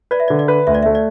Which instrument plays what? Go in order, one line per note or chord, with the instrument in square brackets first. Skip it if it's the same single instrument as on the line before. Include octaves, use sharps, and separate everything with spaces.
[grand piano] B4 [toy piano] D5
[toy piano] E5
[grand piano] D3 [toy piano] D5
[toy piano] D5
[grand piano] B4
[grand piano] D2 [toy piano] E5
[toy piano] D5
[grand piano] A3 [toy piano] E5
[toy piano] D5